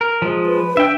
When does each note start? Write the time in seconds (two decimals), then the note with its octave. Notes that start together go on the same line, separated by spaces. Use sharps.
0.01 A#4
0.22 F3 G#3
0.46 B4
0.77 D4 E5 G5